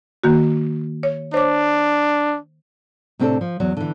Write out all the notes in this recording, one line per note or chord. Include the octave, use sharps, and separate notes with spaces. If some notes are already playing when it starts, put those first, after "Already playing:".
D#3 A#3 F#4
C#5
D4 C5 C#5 D6
A2 C3 C4 D4 A4
F3
E2 F#3
D3 E3